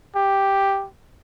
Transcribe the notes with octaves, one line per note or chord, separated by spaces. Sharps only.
G4